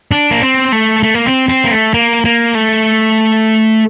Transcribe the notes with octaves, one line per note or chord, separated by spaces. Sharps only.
D4
A#3
C4
A3
A3
A#3
C4
C4
A#3
A3
A#3
A#3
A3